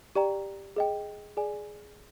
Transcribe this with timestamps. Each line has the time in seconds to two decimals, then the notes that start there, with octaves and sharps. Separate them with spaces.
0.16 G4 D5 G5 A#5
0.76 G#4 D#5 G5
1.37 G#4 D5 G#5